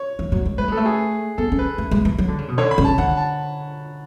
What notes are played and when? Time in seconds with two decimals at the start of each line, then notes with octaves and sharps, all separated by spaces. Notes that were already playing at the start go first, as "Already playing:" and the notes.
Already playing: C#5
0.19 E3
0.32 F#3
0.46 G#3
0.58 A3 B4
0.68 G#3 A4
0.77 A3
0.86 G#4
1.38 B3 A4
1.52 C#4
1.59 B4
1.78 A3
1.91 G#3
2.05 E3
2.18 F#3
2.28 D3
2.38 C#3
2.48 B2
2.58 D3 C#5
2.71 B5
2.78 C#3
2.85 A5
2.98 D3 F#5
3.17 A5